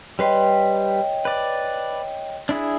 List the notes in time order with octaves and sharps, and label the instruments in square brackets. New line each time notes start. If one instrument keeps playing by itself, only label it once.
[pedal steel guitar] G3 B4 C6 [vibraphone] C#5 D#5 G5
[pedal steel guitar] B4 D5
D4 E4 G#4